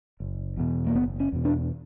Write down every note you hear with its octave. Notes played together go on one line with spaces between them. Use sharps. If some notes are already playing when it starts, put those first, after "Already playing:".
F#1
E2 B2
A#3
F#1 B3
C#4
E2 B2
D4